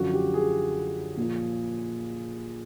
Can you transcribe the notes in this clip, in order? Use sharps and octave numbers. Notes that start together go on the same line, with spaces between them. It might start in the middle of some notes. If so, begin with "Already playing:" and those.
Already playing: F#2 D3 F3 F#4
G4
G#4
A#2 F3